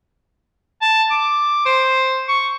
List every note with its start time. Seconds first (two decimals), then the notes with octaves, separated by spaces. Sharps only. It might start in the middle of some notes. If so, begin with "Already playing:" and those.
0.82 A5
1.11 D6
1.66 C5
2.28 C#6